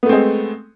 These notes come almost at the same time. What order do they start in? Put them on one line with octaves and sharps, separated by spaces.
B3 A3 C4 G#3